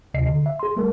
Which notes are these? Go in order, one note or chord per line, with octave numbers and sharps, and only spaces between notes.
D2 C3 D#5 C7
D3
E5
G#4 C6
G3 A3 A#4